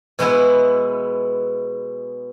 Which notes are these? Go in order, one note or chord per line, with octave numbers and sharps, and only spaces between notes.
B2 G#3 B3 E4